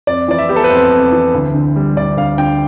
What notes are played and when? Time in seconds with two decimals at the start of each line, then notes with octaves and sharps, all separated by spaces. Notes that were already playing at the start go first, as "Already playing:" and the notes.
0.07 F2 D5
0.28 E3 D5
0.38 E5
0.49 B3 G4
0.56 A4
0.64 B4
0.70 F2 C5
0.92 F2
1.12 E3
1.34 D2
1.54 D3
1.76 G3
1.97 D2 D5
2.17 D2 F5
2.38 D3 G5